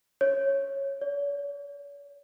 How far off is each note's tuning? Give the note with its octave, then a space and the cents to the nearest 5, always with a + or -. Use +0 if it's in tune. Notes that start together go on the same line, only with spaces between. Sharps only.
C#5 -10
C#5 +45